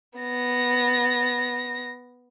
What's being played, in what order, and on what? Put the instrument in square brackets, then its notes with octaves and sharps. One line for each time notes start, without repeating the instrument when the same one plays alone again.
[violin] B3 A#6